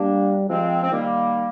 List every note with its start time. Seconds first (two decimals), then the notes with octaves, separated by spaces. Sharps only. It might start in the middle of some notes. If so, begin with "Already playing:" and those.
Already playing: G3 A#3 D4
0.49 F3 G#3 C4
0.83 C4
0.91 D#3 G3 A#3